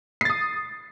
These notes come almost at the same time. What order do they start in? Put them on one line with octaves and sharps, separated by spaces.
C7 A6 D#6